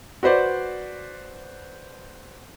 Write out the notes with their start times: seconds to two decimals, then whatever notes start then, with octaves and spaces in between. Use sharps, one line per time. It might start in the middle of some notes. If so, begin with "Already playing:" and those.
0.23 F#4 B4 C5 D5